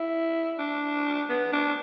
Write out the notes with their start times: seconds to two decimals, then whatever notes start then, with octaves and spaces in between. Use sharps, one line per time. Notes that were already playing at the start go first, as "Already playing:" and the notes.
Already playing: E4
0.59 D4
1.29 B3
1.53 D4